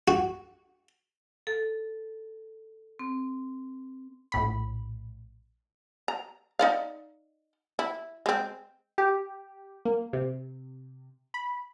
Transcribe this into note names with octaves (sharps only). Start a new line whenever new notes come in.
F#4
A4
C4
A#1 A2 B5
A#5
D#4 D5 F5
E4
G#3 C4
G4
A#3
C3
B5